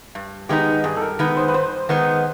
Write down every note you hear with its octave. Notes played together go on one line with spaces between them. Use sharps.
G2
D#3 G#3 B3 D#4 G4
G2 G#4
A4
A#4
D#3 G#3 B3 D#4 B4
C5
B4
G2 C5
D#3 G#3 B3 D#4